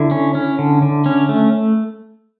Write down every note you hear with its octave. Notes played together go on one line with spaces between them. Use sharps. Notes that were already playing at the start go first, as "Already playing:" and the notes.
Already playing: D3 E4
C#4
C#4
D3
D3
C#4
A3